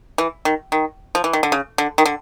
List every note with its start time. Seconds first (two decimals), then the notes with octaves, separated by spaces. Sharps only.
0.18 E3
0.45 D#3
0.72 D#3
1.15 F3
1.24 E3
1.33 D#3
1.43 D3
1.52 C#3
1.78 D3
1.98 D#3
2.05 D3